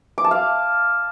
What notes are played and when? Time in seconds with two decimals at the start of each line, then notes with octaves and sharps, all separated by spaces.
0.18 D6
0.24 A5
0.31 F5